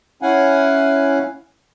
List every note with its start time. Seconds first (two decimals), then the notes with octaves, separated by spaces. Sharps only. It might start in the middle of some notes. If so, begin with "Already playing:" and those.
0.22 C#4 E4 F5 F#5 G#5